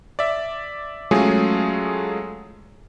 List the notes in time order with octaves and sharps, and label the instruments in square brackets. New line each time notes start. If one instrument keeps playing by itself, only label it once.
[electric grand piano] D5 E5
F#3 G#3 A3 C#4 F4 G#4